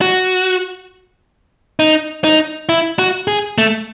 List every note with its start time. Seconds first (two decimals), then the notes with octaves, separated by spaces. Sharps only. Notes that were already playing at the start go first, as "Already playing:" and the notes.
0.01 F#4
1.79 D#4
2.24 D#4
2.69 E4
2.99 F#4
3.28 G#4
3.58 A3